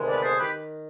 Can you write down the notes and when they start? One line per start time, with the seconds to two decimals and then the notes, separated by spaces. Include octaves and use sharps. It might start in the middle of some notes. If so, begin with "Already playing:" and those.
Already playing: D2 C3 D#3 G#3 B3
0.09 B4 D5
0.23 G#4 C5
0.38 D#3 G4 B4